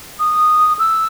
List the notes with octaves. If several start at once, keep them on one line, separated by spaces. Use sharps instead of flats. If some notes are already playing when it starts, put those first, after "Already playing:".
D#6
E6